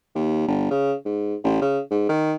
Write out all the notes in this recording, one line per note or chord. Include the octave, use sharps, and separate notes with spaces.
D#2
G1
C#3
G#2
A1
C#3
G#2
D#3